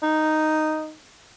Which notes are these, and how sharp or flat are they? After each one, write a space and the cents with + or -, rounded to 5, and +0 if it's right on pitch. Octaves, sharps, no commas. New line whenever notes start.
D#4 -5